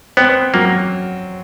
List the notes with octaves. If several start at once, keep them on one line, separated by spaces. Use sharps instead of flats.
B3 C4
F#3 A#3